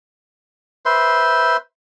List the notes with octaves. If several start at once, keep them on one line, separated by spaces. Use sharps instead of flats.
B4 C5 E5 C6